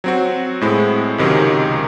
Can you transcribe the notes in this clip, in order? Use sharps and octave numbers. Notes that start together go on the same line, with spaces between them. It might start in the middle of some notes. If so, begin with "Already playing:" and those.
F#3 C4 F#4
A2 G#3 C4 E4
C#2 C3 D#3 F#3 C#4